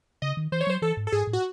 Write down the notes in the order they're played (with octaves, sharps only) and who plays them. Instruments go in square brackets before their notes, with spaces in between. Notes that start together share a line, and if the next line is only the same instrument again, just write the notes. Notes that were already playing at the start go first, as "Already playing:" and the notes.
[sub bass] C#3 [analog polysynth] D#5
[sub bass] D#3
[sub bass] E3 [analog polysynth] C5
[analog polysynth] C#5
[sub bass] F#3 [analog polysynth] C5
[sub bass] E3 [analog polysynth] A4
[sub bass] G#2
[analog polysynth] A4
[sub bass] G#2 [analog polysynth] G#4
[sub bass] A2
[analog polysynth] F#4